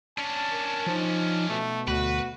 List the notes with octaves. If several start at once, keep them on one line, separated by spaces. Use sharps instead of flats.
C#4 D4 A5
A#4
F3 D#4
B2 A3
D2 F#4 B4